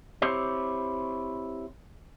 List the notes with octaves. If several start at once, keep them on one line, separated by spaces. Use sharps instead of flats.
C4 E4 G4 C5 C#5